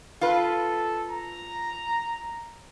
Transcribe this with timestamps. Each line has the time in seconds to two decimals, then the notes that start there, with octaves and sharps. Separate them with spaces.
0.21 F4 A4 B4
1.10 A#5